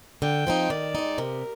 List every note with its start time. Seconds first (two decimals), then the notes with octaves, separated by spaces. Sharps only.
0.22 D3 G5
0.47 F3 C4 D#4
0.70 D#3 D5
0.95 G#3 D#4
1.18 C3 A#4